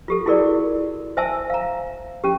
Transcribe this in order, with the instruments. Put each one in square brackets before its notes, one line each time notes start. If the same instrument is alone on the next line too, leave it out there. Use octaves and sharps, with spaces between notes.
[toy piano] F4 G4 A4
E4 F#4 G#4 A#4 D5
C5 E5 G#5 A5 E6
F5 A#5
C#4 G4